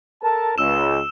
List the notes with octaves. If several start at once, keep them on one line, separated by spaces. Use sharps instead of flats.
A4 A#4 A5
C#2 E6 E7